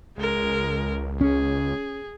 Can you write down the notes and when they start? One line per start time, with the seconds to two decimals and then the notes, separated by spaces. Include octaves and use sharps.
0.18 C#2 G#3 A#4
1.21 C#4 G#4